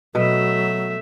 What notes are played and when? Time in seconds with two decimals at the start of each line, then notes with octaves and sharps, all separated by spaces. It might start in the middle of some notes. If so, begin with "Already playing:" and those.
0.15 B2 F#3 A3 B4 E5